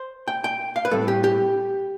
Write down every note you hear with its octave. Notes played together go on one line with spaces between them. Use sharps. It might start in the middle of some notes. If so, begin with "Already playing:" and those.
Already playing: C5
G5
G5
F5
B4
A2 G3 C4 A4
G4
G4